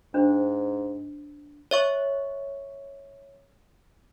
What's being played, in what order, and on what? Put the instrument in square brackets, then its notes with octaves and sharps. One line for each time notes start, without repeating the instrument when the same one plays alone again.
[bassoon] G#2 [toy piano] D4 C5
[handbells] C#5 E5 C#6